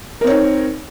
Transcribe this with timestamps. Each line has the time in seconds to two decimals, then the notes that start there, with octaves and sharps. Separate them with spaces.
0.21 A#4
0.24 C4
0.27 C#5
0.30 D#4